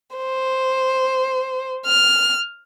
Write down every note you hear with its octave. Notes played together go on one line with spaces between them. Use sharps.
C5
F6